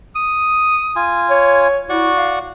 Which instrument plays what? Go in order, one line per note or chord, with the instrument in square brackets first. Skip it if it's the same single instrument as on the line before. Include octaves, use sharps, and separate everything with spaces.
[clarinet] D#6
[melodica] F4 G#5
[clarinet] C#5
[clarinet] E4 [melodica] F#4 D5 C#6
[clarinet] F5